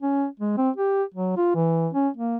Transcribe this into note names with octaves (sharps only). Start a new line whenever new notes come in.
C#4
G#3
C4
G4
F#3
F4
E3
C#4
A#3